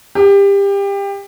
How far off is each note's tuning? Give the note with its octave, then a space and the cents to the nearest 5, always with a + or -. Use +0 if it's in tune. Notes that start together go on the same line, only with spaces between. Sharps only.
G4 +25